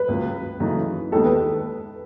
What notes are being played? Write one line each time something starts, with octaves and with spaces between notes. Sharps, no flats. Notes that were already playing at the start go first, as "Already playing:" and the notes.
Already playing: B4
C#2 C#3 F#3
F#2 C#3 E3 A3 D#4
D#2 D#3 G#3 B3 D#4 A4
B4